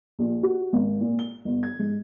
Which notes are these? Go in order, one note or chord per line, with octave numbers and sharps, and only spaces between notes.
A#1
F#4
G#1
A#2
G7
G1
G#6
G#2